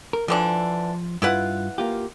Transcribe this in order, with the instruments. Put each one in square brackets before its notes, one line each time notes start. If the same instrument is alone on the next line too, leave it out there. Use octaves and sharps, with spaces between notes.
[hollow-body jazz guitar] A#4
[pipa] D3 E3 D4 [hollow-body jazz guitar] F3
[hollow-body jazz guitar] G2 F4 [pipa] E4 B4 F#5
[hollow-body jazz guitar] A#3 F4 G4